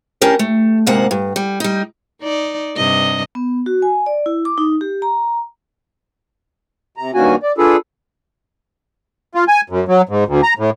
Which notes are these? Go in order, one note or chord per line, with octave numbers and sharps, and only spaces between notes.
C#4 D4 G4 A#4
A3
D2 G#2 C3 A#3 F#5
G2
G3
G3 D#4
D#4 D5
G2 C3 D#5
B3
F#4
G#5
D5
E4
D6
D#4
G4
A#5
C3 A#5
G2 D#3 A#3 C#4 F#4 G#5
D5
D4 F4 G#4 A4 B4
F4
G#5
F#2
F#3
G#2
D2
A#5
A2